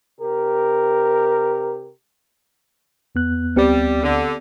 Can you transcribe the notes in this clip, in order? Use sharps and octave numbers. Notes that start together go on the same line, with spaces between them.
C3 G4 A#4
E2 B3 F#6
D2 G3 B3 C4 G4
D3